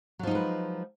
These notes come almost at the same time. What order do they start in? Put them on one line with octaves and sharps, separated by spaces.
F#3 F3 D#4 G#3 B4